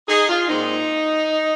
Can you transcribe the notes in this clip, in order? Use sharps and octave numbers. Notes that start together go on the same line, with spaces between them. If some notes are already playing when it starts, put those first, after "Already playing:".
D#4 G#4
F4
A#2 G#3 C4 D#4